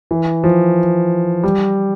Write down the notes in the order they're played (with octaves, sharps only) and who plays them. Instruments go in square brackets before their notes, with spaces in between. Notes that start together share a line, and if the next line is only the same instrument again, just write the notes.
[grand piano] E3
F3
G3